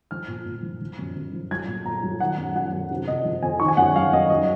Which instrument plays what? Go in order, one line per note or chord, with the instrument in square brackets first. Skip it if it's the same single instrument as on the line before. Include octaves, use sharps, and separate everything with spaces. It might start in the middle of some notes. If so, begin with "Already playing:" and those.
[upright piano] F3 F6
A#2
A#2
F3
F3
F#2
F#2
F3
F#3 G#6
A#2
A#2 A#5
F#3
D#3 F#5
F#2
F#3 F#5
F#2
C3
F2 D#5
F3
F2 G#5
D#3 C#6
G#5
F#2 F#5
F#3 F5
F#2 D#5
F#3 D#5